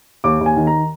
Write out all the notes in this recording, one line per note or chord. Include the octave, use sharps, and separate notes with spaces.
D#2 D6
D#2
G#5
D#3
A#5